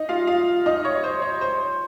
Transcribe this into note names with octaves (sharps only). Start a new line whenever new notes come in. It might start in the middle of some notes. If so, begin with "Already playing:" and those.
Already playing: D#4 D#5
F4 F5
F4 F5
D#4 D#5
C#5
C5
C#5
C5